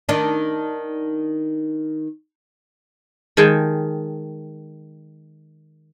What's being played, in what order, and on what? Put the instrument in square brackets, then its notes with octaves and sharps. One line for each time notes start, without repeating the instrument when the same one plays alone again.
[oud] D#3 D4
[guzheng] D#3 G#3 G#4 G5 A5